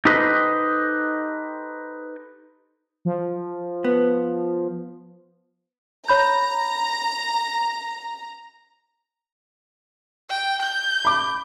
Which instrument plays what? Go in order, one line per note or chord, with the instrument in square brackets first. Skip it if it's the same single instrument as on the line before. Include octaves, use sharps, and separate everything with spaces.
[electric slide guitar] D#4 G4 A4 B4 C5 D#5
[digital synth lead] F3
[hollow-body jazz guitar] B3
[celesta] C#5 B5 G6 [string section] A#5
[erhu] G5
G6
[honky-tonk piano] B5 D6